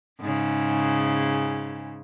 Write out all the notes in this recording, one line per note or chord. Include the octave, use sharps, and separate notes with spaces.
G#2 C#3